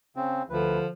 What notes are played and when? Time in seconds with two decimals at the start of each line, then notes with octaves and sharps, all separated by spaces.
0.16 C#3 C4
0.50 D2 D3 F3 B4